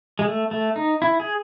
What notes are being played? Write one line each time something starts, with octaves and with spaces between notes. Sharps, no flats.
G#3
A3
A3
D#4
E4
G#4